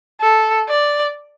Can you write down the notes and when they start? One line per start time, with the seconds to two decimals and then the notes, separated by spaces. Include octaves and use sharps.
0.21 A4
0.69 D5